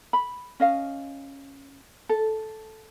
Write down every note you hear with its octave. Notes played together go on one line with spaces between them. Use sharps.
B5
C#4 D#5 F5
A4